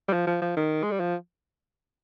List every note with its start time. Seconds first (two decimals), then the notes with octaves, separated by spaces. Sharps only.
0.08 G3
0.13 F3
0.27 F3
0.42 F3
0.57 D#3
0.83 G#3
0.91 G3
1.00 F3